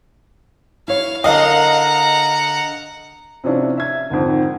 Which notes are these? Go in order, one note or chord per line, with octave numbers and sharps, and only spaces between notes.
E4 C#5 F5
D3 A#4 D#5 F5 F#5 A#5
C3 F3 C#4 D4 E4 F4
E5 G#6
F2 G#2 D3 D#3